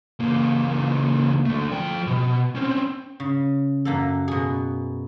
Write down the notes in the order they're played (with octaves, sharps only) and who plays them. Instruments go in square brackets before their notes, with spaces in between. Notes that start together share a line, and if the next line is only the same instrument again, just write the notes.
[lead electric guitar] C#2 A#3
D3 A3
F3 G5
B2
C4 C#4
[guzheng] C#3
F#2 A#3 A4
B2 G#4